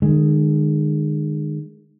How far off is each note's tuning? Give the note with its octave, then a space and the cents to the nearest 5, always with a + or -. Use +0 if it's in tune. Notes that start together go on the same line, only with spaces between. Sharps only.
D#3 -40 G#3 +0